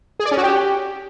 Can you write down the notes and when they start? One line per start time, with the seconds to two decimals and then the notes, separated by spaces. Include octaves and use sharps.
0.20 G#4
0.25 D5
0.31 C#4
0.37 F#4
0.43 G4